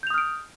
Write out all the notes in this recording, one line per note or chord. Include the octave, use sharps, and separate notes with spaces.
D#6 F6 G6 D7 F7